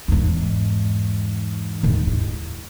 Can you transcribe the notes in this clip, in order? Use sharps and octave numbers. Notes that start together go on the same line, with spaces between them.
E2 G#2
D#2 G#2
E4